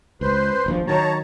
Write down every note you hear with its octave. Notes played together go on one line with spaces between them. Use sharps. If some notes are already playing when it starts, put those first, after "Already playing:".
C#2 B4 C5 C6
D#1 A#1 F3
D#3 F#3 C#5 A5 A#5